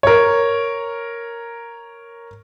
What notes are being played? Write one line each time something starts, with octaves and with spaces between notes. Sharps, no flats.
A#4 C#5